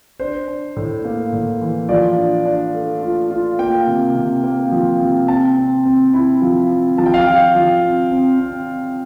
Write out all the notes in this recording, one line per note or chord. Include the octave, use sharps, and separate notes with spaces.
D4 C5
D4
A2
A#3
A2
E3
F3 D5
D4
D4
A3
F4
F4
A#3 G5
C3
C3
A#3
F3
C3
C4 A5
C4
C4
E4
F3
C4
F3 A5
G5
F5
G5
F3
F3
C4
C4
C4